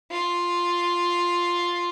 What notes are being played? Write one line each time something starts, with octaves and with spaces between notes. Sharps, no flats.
F4